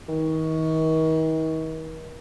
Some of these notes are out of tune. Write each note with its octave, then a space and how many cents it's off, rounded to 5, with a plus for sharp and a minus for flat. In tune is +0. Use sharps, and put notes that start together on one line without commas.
D#3 +40